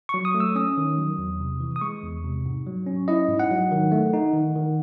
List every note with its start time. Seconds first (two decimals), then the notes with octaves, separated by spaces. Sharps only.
0.09 F#3 C#6
0.25 D#6
0.34 A3
0.40 E6
0.55 C#4 D#6
0.77 D#3
0.98 F#3
1.18 E2
1.40 C3
1.60 E3
1.76 D#6
1.81 G#3 C#6
2.03 E2
2.24 C3
2.46 G#2
2.67 F#3
2.87 C#4
3.08 E4 D#5
3.29 G#2
3.39 F#5
3.51 F#3
3.72 D#3
3.92 A3
4.13 D#4
4.34 D#3
4.55 D#3